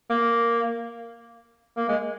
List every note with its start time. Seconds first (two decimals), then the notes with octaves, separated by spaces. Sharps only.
0.10 A#3
1.77 A#3
1.89 G#3